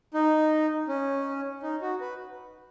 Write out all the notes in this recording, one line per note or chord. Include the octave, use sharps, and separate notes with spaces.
D#4
C#4
D#4
F#4
B4